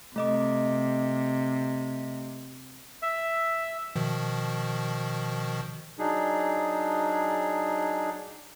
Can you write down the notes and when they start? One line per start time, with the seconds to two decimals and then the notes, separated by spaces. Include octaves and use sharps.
0.16 C3 A3 D#5 D6
3.02 E5
3.95 B2 D#3 F3
5.99 F#3 D4 D#4 G#4